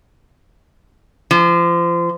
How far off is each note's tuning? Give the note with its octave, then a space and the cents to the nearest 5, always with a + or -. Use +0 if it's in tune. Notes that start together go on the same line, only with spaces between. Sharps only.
F3 -30